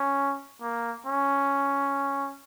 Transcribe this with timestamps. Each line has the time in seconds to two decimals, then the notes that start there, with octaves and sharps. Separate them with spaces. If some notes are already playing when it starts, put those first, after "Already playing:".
Already playing: C#4
0.62 A#3
1.06 C#4